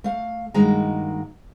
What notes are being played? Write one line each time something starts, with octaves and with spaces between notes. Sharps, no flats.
A3 F5
G2 D#3 G#3 A#3 F#4 A#5